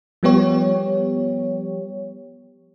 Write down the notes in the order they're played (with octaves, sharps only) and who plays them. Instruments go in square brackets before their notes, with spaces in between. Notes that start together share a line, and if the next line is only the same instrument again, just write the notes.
[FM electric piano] F3 G3 B3 G4 C#5